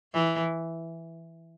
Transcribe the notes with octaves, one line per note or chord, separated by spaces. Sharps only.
E3